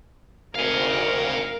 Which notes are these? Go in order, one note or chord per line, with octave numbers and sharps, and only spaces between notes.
G#1 D2 A#4 F5 G#5